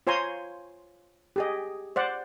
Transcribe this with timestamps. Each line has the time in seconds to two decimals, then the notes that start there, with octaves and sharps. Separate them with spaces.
0.07 F4 C5 C#5 G#5 A#5 C6
1.36 G4 G#4 D#5
1.96 C5 D5 F#5